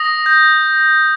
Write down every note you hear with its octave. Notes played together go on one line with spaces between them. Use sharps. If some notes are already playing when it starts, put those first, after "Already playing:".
Already playing: D#6 A#6
G6